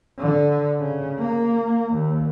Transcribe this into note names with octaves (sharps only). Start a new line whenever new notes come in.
D3
C#3
A#3
D#2